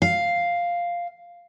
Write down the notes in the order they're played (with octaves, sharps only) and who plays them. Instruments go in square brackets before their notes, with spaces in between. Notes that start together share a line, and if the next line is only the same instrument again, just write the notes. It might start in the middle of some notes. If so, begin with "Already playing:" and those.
[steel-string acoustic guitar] F5